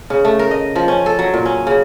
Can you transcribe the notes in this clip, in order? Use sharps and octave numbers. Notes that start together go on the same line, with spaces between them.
C#3
A3
A#4
D#5
F3
C#4
A4
F#3
A#2
C#4
C#3